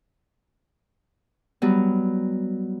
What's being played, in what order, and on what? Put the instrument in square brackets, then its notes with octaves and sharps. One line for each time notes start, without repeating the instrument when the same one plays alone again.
[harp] F#3 G3 B3